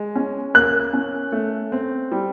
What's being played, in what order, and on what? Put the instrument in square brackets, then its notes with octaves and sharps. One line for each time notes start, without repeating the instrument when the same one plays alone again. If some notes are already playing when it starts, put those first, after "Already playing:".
Already playing: [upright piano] G#3
C#4
[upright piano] A#3 [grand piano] F#6
[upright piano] C#4
A3
C4
G3